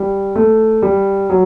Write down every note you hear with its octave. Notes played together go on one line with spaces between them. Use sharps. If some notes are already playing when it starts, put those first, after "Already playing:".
Already playing: G3
A3
G3
F#3